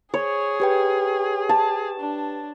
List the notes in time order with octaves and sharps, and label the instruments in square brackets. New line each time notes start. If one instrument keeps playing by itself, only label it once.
[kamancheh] G#4 [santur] C#5 [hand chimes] C#6
[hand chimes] G4 B4 G5
[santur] A5
[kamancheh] D4